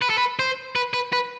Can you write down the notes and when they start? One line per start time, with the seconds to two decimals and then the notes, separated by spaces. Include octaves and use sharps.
0.01 B4
0.09 A4
0.18 B4
0.39 C5
0.76 B4
0.94 B4
1.13 B4